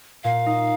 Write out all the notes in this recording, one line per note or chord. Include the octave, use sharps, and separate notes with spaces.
A#2 F5
D#4